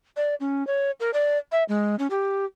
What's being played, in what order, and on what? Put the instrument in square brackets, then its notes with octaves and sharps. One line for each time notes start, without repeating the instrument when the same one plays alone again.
[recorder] D5
C#4
C#5
A#4
D5
E5
G#3
C#4
G4